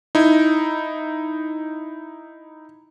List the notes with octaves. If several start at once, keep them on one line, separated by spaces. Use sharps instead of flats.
D#4 E4